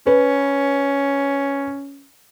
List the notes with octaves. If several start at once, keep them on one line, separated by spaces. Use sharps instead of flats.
C#4 B4